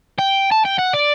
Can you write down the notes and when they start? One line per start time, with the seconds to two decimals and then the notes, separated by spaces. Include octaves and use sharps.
0.18 G5
0.52 A5
0.65 G5
0.79 F#5
0.94 D5